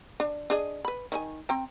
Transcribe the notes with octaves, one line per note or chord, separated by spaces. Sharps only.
D4
D4 G#4 D#5
B4 B5
D#3 D#4 G#5
C4 G5 A#5